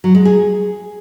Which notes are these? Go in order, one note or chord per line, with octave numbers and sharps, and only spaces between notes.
F#3
G#3
G#4